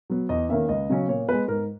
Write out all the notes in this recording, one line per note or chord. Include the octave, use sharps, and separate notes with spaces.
F#3 B3
E2 D#5
D#3 A#3 C#4 E5
C#2 D#5
C#3 F#3 C#4
A#2 C#5
G#3 B3 B4
G#2 A#4